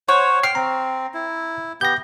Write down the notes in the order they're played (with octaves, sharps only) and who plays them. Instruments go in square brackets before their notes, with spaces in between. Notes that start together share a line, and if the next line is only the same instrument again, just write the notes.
[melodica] C5 F#5 [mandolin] C#5
[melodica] G5 [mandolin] F6 [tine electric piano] C7
[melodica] C4 [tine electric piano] A#5
[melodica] E4
[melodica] B3 G4 [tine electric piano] G6 A#6